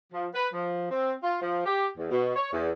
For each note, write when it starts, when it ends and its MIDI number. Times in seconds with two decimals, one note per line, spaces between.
0.12 0.27 53
0.34 0.47 71
0.54 0.88 53
0.90 1.13 60
1.23 1.38 65
1.41 1.65 53
1.65 1.87 67
1.97 2.08 40
2.11 2.34 47
2.36 2.50 73
2.52 2.71 40